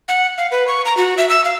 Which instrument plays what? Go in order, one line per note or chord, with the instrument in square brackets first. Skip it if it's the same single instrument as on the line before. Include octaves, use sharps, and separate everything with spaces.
[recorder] F#5
F5
B4
C#6
A#5
F#4
E5
E6
F5